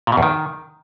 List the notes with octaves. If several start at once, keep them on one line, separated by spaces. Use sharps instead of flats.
A#2
B2
E2
D#3